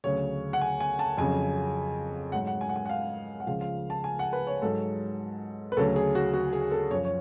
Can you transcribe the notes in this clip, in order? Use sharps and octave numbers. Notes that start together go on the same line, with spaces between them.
D2 C#3 F#3 C#5
F#5
G#5
G#5
A5
F2 C#3 F#3 G#5
G#2 F#3 F#5
F#5
G#5
F#5
G#5
F#5
F5
F#5
C#2 C#3 F3 F5
F5
A5
G#5
F#5
B4
C#5
G#2 F#3 A4
B4
D2 C#3 F#3 A4
G#4
F#4
F#4
G#4
A4
F#2 F3 C#5
C#5